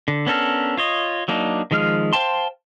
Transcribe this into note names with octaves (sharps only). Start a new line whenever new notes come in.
D3
B3 C#4 D4 A4 A#4
F4 C#5 D#5
F#3 A#3 D4 D#4
D#3 F3 G#3 F5 F6
C5 F5 G5 A5 C6